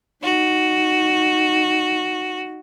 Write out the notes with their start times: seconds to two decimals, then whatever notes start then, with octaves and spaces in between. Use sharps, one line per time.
0.23 D#4 F#4